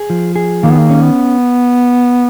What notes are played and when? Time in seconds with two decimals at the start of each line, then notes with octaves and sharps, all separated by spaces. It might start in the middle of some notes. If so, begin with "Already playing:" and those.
Already playing: G#4
0.10 F3
0.36 G#4
0.63 D#3 A#3
0.71 B3
0.79 A#3
0.90 C#4
1.03 B3